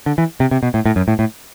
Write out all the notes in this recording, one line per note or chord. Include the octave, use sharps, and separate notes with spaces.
D3
E3
C3
C3
B2
A2
A2
F#2
A2
A2